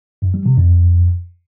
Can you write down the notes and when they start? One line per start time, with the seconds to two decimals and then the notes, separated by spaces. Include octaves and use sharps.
0.22 F#2
0.34 G3
0.46 C3
0.57 F2